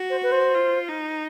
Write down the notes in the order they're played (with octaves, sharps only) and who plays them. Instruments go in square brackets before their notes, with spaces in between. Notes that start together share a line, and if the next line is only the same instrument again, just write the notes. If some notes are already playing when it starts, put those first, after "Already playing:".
Already playing: [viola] F#4
[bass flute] C5
B4
C5
[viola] F4
D#4